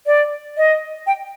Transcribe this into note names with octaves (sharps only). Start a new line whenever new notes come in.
D5
D#5
G5